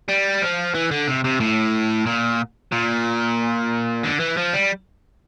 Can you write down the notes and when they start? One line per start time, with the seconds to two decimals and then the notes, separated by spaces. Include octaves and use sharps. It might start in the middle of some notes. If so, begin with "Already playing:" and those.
0.08 G3
0.42 F3
0.74 E3
0.91 D3
1.08 C3
1.24 C3
1.40 A2
2.07 A#2
2.72 A#2
4.04 D3
4.20 E3
4.37 F3
4.54 G3